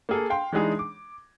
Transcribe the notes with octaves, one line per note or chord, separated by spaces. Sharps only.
A#3 G#4 A4
F5 G5 C6
E3 G#3 D4 D#4 G#4
D6